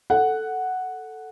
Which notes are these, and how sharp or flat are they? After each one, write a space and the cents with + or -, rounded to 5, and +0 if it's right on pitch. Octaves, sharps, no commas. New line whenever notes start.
A4 +0 F#5 +0